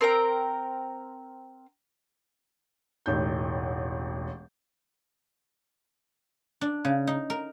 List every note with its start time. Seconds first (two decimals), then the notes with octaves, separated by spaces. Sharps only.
0.01 C4 A#4 G5 A#5
3.06 E1 A1 D#4 G6
6.61 D4
6.85 C#3
7.07 D#4
7.30 A#4